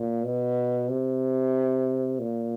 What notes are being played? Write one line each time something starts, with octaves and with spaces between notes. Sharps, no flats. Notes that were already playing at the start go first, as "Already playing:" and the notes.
Already playing: A#2
B2
C3
A#2